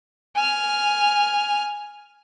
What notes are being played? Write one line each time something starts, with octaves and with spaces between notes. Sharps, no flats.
G#5 F6